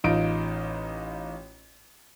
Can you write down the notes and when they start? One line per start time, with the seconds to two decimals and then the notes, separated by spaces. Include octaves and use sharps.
0.04 A1 D#4 F4 D7